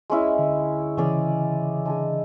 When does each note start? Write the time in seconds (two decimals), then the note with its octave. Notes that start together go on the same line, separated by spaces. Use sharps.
0.10 G#3 C#4 E4
0.39 D3
0.97 C#3 E3 C#4 G#4 D5
1.85 G#3 D4 G#4